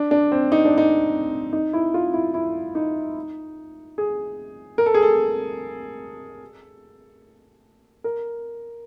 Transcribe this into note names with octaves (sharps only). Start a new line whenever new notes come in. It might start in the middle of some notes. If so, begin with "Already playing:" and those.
Already playing: D4
D4
C4
D#4
D4
D#4
D#4
E4
F4
E4
E4
D#4
G#4
A#4
A4
G#4
A4
A#4